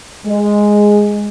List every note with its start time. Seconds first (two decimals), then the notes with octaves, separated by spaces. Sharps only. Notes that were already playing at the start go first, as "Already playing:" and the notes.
0.26 G#3